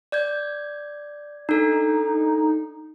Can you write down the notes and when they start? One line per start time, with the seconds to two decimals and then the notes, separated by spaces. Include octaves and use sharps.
0.12 D5 G6 G#6
1.49 D4 D#4 A4